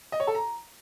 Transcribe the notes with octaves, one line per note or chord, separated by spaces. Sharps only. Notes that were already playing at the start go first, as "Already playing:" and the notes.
D#5
C#5
A4
A#5